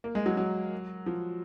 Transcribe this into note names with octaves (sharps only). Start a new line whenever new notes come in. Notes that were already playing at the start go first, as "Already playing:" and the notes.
A#3
G#3
F#3
F#3
F3